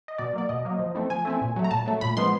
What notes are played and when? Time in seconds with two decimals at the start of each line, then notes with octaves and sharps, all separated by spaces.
0.08 D#5
0.18 B2 D5
0.33 F#3 A#3 D5
0.49 B2 D#5
0.65 F#3 A#3
0.79 F3
0.95 A3 C4 E4
1.10 F3 G#5
1.25 A3 C4 E4
1.41 A#2
1.56 F#3 A3
1.64 A#5
1.71 A#2 A5
1.86 F#3 A3
2.01 A#2 B5
2.17 F3 G#3 B3 C6